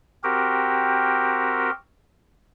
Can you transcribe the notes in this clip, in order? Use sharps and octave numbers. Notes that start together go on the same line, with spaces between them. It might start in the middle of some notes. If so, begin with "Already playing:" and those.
C4 F#4 G4 A#4